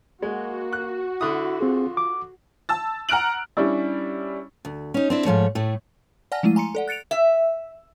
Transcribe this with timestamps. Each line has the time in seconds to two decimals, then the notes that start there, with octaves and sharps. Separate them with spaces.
0.22 G#3 A#3 F#4
0.73 F#6
1.21 D3 E4 D#6
1.61 C4 F4 G#4
1.97 D6
2.69 A5 E6 A6
3.09 F#5 A#5 F6 F#6 D7 F#7
3.57 G3 C#4 D4 E4
4.65 D2
4.94 C#4 D#4
5.10 C4 D4 E4
5.25 G#2 F3 A3 C#5
5.55 A2 A3
6.32 D5 F#5 G#5 A5 F6 A#6
6.43 F3 G#3 A3 E4 D#7
6.56 G#5 A#5 C6 C#7
6.75 A4 D5 F#5
6.88 F#6 A6 C#7 D7 F7
7.11 E5